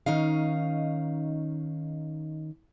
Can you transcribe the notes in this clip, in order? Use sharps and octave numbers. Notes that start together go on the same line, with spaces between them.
D#3 C#4 D#4 F5